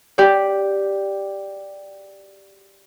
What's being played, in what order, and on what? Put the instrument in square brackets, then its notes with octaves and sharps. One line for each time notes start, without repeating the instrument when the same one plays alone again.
[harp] G4 D5